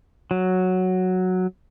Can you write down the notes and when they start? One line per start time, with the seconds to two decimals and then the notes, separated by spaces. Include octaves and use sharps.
0.31 F#3